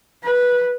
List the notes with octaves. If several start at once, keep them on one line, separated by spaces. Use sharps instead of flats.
B4